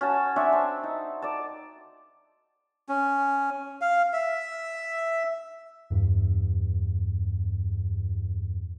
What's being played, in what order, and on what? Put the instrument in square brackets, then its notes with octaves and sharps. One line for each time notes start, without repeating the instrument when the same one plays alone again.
[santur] C#4 F#4 A5
C4 D4 E5 C#6
C4
D#4
D5 A5
[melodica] C#4
F5
E5
[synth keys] E2 G2